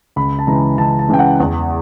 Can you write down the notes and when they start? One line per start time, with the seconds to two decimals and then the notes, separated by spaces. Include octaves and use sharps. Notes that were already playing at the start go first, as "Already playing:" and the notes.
0.16 C#2 B5
0.39 A5
0.47 C#3 E3 G#3 A#5
0.78 C#2 A5
0.99 A5
1.09 C#3 E3 G#3 G5
1.19 F#5
1.40 E2